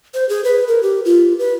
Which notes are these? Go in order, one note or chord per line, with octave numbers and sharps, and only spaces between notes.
C5
G#4
B4
A#4
G4
F4
B4